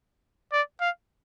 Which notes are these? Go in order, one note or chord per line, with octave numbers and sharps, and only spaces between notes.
D5
F5